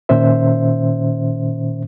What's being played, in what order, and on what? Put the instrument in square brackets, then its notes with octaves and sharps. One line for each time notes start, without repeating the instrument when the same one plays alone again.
[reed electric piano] A#2 D#3 C#4 C5 E5